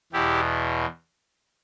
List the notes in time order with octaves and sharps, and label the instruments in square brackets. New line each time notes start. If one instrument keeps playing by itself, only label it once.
[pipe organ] E2 B2 E4 G4